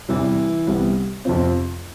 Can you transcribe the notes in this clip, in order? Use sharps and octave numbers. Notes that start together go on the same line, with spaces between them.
E2 C3 E3 G3
C2 C3 G3 B3
F2 C3 F3 C4 F4